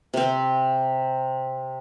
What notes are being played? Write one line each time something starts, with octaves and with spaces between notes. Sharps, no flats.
C3 C4